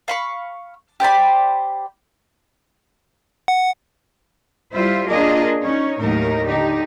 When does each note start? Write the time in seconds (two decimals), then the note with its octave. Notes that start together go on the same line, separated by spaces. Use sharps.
0.08 F5 B5 C#6
1.00 G4 C5 D5 B5
3.48 F#5
4.72 G3 E4 F4 C5 E5
5.07 A#3 D4 F4 G#4 A#4 D#5
5.63 C#4 D#4 C#5
6.00 D#2 A2 F#3 D#4 A#4
6.46 D3 D#4 G4